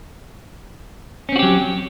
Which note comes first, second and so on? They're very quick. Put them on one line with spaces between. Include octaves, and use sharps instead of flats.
C#4 C4 F#4 G4 F#3